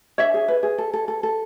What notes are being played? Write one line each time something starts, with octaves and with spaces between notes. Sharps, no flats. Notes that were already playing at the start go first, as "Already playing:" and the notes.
D4 C#5 E5
G#4
B4
G#4
A4
A4
A4
A4